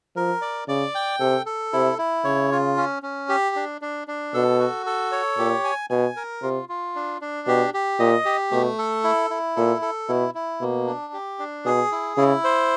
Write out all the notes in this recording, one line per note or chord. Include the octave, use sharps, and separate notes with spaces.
F3 A#4
D5
C#3 D5
G5
C3 A4
A4
C3 E4
E4
C#3 C#5
F4
C#4
C#4
G4
D4
D4
D4
B2 A4
F#4
A4
C#5
A#2 G4
G#5
B2 G#5
A#4
C3 F4
F4
D4
D4
B2 G4
G4
A#2 D#5
G4
B2 A3
A4
E4
E4
A#2 A4
A4
B2 E4
E4
B2 A#3
D4
G4
D4
B2 G#4
E4
C#3 E4
C5